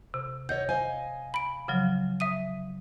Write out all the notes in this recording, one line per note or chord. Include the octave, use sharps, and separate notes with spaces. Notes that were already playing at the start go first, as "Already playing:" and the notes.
C3
C#5 D#5 F#5 G6
C5 D#5 F5 G#5
B5 D7
C#3 F3 F#3
E5 D#6 D#7